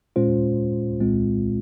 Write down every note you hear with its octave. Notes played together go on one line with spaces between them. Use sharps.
A#2 G#3 C#4 F4 C5
C2 A#2 G#3 C4 F4